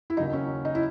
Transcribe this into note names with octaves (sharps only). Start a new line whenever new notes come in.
E4
D#2 C#3 F#3 D#4
C#4
D#4
E4